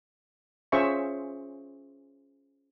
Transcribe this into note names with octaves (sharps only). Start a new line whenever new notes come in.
C#4 F4 G#4 C5 E5 C#6